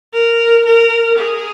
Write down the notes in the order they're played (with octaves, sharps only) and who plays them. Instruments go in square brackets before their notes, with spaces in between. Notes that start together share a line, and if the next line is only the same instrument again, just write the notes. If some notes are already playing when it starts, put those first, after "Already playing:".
[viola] A#4
A#4
G#4